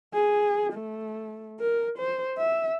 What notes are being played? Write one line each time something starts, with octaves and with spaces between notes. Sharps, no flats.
G#4
A3
A#4
C5
E5